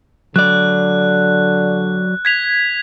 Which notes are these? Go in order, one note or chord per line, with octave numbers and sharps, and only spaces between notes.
D3 F#3 D5 F#6
G#6 B6 F7